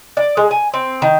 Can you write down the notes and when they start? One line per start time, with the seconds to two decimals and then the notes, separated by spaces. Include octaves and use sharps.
0.17 D5
0.37 G#3
0.51 G#5
0.74 C4
1.02 D#3